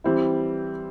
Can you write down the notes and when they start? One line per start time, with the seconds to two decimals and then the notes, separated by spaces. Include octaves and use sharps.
0.04 E3 G3 C4 E4